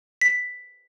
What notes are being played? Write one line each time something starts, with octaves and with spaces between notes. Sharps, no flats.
B6